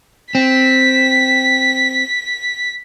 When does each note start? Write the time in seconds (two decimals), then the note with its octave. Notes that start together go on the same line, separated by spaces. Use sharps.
0.35 C4 B6